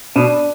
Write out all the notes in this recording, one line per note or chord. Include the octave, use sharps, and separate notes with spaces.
B2 D4